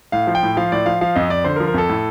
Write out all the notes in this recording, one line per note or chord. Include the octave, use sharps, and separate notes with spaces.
A2 F5
F3
G5
A2
F3 F5
A2 D5
F3 F5
F3 F5
F2 D#5
F2 D5
D3 C5
A#4
F3
A#4
F2 A4
A2